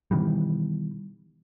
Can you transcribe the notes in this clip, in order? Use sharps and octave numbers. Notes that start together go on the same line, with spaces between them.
B2 D#3 E3 G3